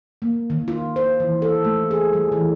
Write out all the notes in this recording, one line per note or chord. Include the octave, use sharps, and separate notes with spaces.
A#3
D#3
F4
C5
E3
A4
A3
G#4
G3
E3